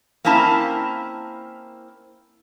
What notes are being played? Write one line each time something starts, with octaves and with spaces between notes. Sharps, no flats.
A#3 C4 C#4 E4 A5 A#5